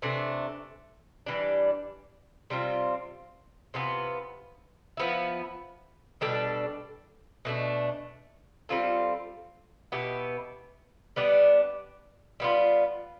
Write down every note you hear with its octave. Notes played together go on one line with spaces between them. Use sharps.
C3 E3 A3 D4
E3 G3 D4 G4
C3 G3 C4 F4
C3 E3 B3 F4
F3 B3 E4
B2 G3 D4 A4
B2 A3 D4
G3 C4 F4 A4
B2 B3 E4 G4
G3 B3 D4 G4
G3 B3 F4